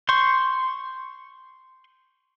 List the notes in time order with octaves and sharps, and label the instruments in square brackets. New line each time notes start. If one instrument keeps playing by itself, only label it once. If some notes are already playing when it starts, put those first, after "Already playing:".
[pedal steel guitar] C6 C#6 G6